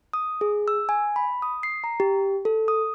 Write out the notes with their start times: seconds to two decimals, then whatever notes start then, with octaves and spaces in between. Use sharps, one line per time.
0.13 D#6
0.41 G#4
0.68 E6
0.89 G#5
1.16 B5
1.42 D#6
1.63 C7
1.84 A#5
2.00 G4
2.45 A4
2.68 D#6